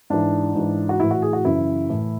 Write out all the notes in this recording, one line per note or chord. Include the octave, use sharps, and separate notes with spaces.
G#2 E3 D4
G#2 E3
F#4
A2 E3 E4
F#4
G#4
F#4
F#2 C#3 E3 E4
A2 E3